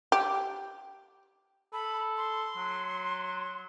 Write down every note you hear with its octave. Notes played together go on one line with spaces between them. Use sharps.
G4
A4 B5
C6
F#3